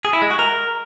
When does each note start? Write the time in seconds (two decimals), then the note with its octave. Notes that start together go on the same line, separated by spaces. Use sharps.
0.05 G#4
0.13 E4
0.22 G#3
0.30 F#4
0.39 A#4